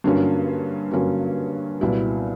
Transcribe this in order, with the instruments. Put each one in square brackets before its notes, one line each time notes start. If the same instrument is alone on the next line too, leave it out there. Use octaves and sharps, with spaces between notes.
[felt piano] G2 D3 F#3 A#3 C#4
G2 D3 F#3 A#3 C#4
C2 A#2 F#3 B3 E4